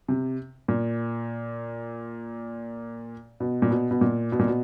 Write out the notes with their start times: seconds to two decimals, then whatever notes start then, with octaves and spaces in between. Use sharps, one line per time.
0.08 C3
0.68 A#2
3.40 B2
3.62 A#2
3.71 B2
3.91 B2
4.01 A#2
4.32 B2
4.39 A#2
4.47 B2